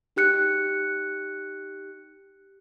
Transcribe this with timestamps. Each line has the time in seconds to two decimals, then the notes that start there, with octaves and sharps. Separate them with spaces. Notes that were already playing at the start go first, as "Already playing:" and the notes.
0.16 D#4 G4 F#6 C#7